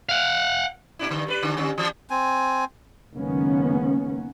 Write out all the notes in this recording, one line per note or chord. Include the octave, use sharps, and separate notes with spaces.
F5 F#5
A#2 D4 E4
G2 D3
G3 A#4 B4
D3 D4
D3 G3 C#4
E3
C4 G#5
F#1 D#3 G#3 A#3 B3 C#4